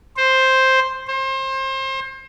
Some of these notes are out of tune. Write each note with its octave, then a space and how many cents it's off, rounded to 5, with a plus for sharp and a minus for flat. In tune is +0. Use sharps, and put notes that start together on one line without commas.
C5 +5
C5 +30